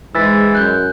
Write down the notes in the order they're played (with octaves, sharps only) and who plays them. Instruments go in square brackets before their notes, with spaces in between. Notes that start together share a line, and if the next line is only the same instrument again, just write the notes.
[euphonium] G#2 [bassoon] E3 [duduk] G#3 [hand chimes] E6 A6 B6
[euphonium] F#2 [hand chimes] F#6 G6